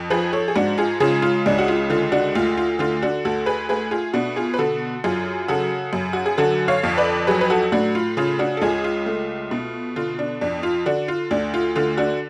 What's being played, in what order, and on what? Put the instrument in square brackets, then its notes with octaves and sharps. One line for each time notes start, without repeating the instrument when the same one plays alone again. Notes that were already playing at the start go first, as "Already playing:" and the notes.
Already playing: [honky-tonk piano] F2
F3 G#4 B4
A4 C#5
G#4
G#2 D4 F#4
F4 G#4
C#3 F4 G#4
F4
C#2 D4
F#4
F4
D3 F4
D4 F#4
D2 F4
F4
D3 F4
D4 F#4
D2 F#4 A4
G#4 B4
A3 G#4 B4
F4 G#4
B2 D4 F#4
F4 G#4
B4
D3 F#4 A4
F#2 F4 G#4
C#3 F#4 A4
F#2
F#4
G#4
D3 F#4 A4
C#5 F5
F2
B4 D5
F#3 G#4 B4
B4
F#4 A4
A2 D4 F#4
F4
C#3 F4
D4 F#4
A4
C#2 F4 G#4
F4
A3
B2
D3 F4
D4
F2 D4
F4
D3 D4 F#4
F4
D2 D4
F4
D3 F4
D4 F#4